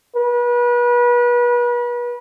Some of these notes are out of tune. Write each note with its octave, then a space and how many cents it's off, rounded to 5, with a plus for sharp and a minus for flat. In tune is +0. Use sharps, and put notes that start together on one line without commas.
B4 -35